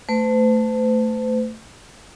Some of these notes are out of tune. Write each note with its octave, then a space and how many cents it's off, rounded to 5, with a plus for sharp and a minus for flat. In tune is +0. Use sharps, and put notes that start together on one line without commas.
A3 +10 C5 -45